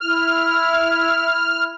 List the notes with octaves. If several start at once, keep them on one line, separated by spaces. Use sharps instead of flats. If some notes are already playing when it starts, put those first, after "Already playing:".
E4 F6